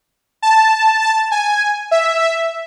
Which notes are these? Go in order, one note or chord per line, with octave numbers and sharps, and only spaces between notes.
A5
A5
G#5
E5
E5